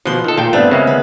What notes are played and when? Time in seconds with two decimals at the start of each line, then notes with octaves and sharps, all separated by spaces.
0.06 B2 F3 F#5 C6
0.24 D#3 F4 A4
0.37 A#2 F5 G5
0.53 G2 A3 B3 C4 D5
0.71 C#3 G#3 A#3 E5
0.87 B3